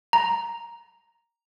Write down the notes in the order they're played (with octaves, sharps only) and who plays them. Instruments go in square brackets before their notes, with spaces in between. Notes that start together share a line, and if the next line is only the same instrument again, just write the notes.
[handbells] A#5